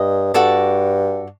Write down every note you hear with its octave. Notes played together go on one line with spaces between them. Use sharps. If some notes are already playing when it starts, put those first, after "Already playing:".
Already playing: G2 D#5
G2 F#4 A4 D5